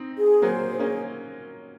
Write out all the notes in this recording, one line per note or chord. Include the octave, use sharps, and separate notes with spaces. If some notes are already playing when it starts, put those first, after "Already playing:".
Already playing: C4 D#4
G#4
F#3 A#3 C5
G#4
A#3 C#4